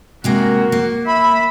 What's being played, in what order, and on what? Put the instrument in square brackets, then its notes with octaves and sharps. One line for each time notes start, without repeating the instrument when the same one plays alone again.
[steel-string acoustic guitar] C3 G#3 A#3 [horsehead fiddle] F#4 A#4
[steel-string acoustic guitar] A#3
[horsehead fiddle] E5 [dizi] B5